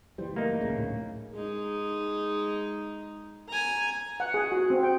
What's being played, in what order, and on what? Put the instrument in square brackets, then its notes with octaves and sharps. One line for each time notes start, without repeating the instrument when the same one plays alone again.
[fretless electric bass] F#1 E3 G3 [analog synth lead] C5
[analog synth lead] A3 [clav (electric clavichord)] A#3 D#4
[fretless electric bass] D1 A#1 C#3
[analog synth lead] A2
[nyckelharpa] G#3 D#4
G#5 A#5
[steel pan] F#5
G#4
F#4
C4
G5